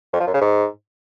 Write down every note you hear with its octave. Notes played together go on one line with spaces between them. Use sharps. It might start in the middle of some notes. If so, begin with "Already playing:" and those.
F2
F3
F#2
C#3
G#2